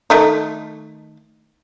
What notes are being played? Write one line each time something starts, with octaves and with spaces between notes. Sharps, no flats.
D#3 A3 D#4